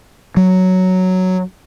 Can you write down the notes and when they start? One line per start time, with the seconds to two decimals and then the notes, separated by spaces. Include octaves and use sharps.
0.37 F#3